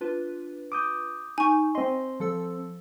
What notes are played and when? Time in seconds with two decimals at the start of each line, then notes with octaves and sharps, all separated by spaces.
0.01 D4 F4 B4
0.72 D6 D#6 G6
1.38 D#4 G#5 C#6
1.75 C4 D#5 C6
2.20 F3 A4 E6